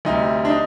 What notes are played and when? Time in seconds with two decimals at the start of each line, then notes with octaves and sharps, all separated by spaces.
0.05 D2 C3 G3 D#4
0.45 D4
0.50 D#4